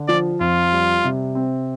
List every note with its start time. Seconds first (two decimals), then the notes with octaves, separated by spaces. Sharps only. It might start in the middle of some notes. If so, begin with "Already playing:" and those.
Already playing: D3
0.08 F3 D5
0.40 F2 F4
0.73 G3
1.04 C3
1.35 C4